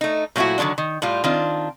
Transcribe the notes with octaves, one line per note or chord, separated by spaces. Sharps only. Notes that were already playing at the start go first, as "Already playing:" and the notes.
A3 D#4
A#2 F#3 A3 E4 F#4
D3 D#3 F#3 G#3 D4
D#3
A2 G3 F4
D#3 C4 D4 F4